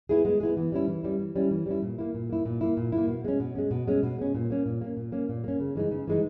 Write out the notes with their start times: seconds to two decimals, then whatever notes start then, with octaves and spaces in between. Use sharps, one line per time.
0.09 B3 E4 G#4
0.25 G#3
0.40 B3 E4 G#4
0.57 E3
0.72 G3 C#4 E4
0.88 E3
1.03 G3 C#4 E4
1.19 E3
1.36 G3 C#4 E4
1.51 E3
1.66 G3 C#4 E4
1.82 A#2
1.98 A#3 E4
2.14 A#2
2.29 A#3 E4
2.46 A#2
2.61 A#3 E4
2.77 A#2
2.92 A#3 E4
3.08 B2
3.25 G#3 C#4
3.40 B2
3.55 G#3 C#4
3.71 B2
3.88 G#3 C#4
4.03 B2
4.18 G#3 C#4
4.34 A#2
4.50 A#3 C#4
4.66 A#2
4.81 A#3 C#4
4.97 A#2
5.12 A#3 C#4
5.29 A#2
5.44 A#3 C#4
5.60 C#3
5.75 E3 G#3 D#4
5.91 C#3
6.07 E3 G#3 D#4